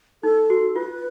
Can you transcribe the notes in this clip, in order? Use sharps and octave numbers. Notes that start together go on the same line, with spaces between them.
D#4 A4
F#4
F4 B4